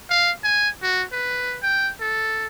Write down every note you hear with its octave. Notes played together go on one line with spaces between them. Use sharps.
F5
G#5
F#4
B4
G5
A4